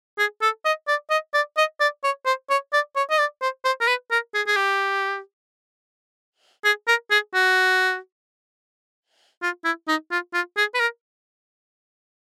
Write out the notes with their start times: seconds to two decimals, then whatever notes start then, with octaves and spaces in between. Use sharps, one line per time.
0.18 G#4
0.42 A4
0.65 D#5
0.88 D5
1.10 D#5
1.34 D5
1.57 D#5
1.80 D5
2.04 C#5
2.26 C5
2.50 C#5
2.73 D5
2.96 C#5
3.10 D#5
3.18 D5
3.42 C5
3.65 C5
3.80 A#4
3.87 B4
4.11 A#4
4.35 G#4
4.47 G#4
4.56 G4
6.65 G#4
6.88 A#4
7.11 G#4
7.34 F#4
9.42 F4
9.64 E4
9.88 D#4
10.11 F4
10.34 F4
10.57 G#4
10.74 B4
10.80 A#4